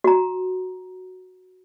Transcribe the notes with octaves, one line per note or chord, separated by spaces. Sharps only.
F#4 A#5